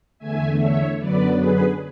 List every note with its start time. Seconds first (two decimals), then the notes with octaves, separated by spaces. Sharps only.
0.19 E2 D3 A3 E5 G#5
0.58 C#5 E5
0.98 F#2 D3 F#3 B3 B4 D5
1.38 G#4 B4